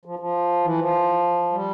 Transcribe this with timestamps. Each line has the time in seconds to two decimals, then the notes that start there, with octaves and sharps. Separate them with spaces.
0.05 F3
0.19 F3
0.64 E3
0.79 F3
1.52 G3